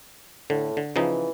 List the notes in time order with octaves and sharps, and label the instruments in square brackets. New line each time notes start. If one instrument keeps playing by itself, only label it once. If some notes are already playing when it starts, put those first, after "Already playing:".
[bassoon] A2 [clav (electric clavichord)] D3
[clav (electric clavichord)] D3
[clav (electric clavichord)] C#3 F3 D#4 [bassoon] E3